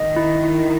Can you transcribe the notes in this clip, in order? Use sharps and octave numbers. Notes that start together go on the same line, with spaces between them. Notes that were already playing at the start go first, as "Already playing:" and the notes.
Already playing: D#3 D#5
E4
E4